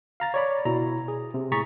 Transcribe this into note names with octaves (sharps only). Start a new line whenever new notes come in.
F5 A#5 A6
C#5 D5 B5
B2 E4 A#5
G#4
C3
A2 G#4 A#5 C#6 A6 B6